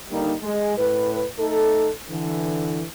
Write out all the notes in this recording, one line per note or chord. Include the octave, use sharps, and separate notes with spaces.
D3 G3 A#3 D#4
G#3
A2 B4
A3 D#4 A4
D3 E3